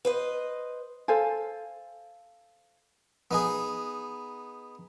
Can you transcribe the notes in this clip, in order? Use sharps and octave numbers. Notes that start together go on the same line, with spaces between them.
B4 C5 D#5
A4 C5 F5 G#5
B3 D#4 G#4